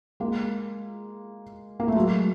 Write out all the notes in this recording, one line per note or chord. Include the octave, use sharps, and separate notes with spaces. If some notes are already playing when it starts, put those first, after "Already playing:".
G#3 A#3
A#3
A3
F#3 G#3